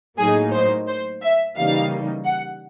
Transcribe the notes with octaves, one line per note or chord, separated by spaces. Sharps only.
A2 F#3 A#3 D#4 G#4
C5
C5
E5
C#3 E3 G3 A#3 D#4 F5
F#5